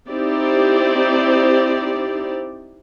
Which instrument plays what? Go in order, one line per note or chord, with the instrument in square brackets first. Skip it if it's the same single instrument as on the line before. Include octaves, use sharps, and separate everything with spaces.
[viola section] C4 D#4 E4 G4 C5 D5